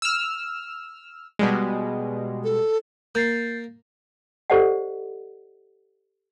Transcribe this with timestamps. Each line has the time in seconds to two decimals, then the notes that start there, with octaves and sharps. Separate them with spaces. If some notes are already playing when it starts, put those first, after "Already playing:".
0.02 E6 F6
1.39 B2 G3 G#3
2.44 A4
3.15 A#3 G6 A6 C7
4.50 G4 A4 C5 D5 D#5 F#5